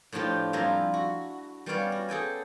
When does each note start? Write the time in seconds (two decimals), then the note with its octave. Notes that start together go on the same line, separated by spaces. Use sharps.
0.12 A2 F3 D4 F4 G4
0.53 F2 G3 E4 F4 G#5 A#5
0.94 F#4
1.66 G3 B3 C#4 C#5 D5 F5
1.92 F#4
2.09 G#4 A4 G5 G#5